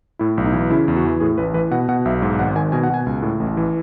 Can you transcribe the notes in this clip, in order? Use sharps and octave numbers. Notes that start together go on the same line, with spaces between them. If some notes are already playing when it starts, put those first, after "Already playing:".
A2 E4
B1
D#4
E3
C#3 E4
E2
F#4
E3
A2 G#4
A1 B4
E3 B4
B2 F#5
B2 F#5
B1 E5
G#2
G#1 F#5
F#5
D#3 G#5
B2 G#5
F#5
B2 G#5
C#2
A2
A1
E3